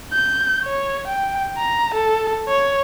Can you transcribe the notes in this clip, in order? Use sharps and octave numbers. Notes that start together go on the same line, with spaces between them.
G6
C#5
G5
A#5
A4
C#5